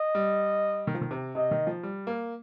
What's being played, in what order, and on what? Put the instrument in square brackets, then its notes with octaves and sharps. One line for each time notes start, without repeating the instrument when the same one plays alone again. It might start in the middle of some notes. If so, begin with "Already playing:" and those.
Already playing: [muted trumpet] D#5
[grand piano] G3
D#3
F3
D#3
C3
[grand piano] C3 [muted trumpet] D#5
[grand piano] D#3
F3
G3
A#3